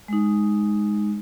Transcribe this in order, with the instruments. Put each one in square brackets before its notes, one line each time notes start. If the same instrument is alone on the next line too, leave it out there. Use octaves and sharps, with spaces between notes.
[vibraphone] G#3 D#4